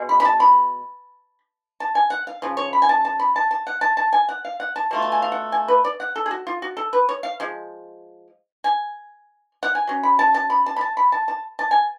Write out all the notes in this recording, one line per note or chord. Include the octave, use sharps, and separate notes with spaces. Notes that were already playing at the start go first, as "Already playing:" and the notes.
Already playing: B2 G#3
B5
B5
A5
B5
A5
G#5
F#5
F5
C#3 F3
C#5
B5
G#5
A5
A5
B5
A5
A5
F#5
A5
A5
G#5
F#5
F5
F#5
A5
B2 A3 F4 A5
A5
G#5
F5
F#5
G#5
B4
D5
F#5
A4
G#4
F#4
F4
F#4
A4
B4
C#5
F5
F3 G#3
G#5
F#5
G#5
F#3 C#4
B5
A5
A5
B5
A5
B5
A5
B5
A5
A5
A5
G#5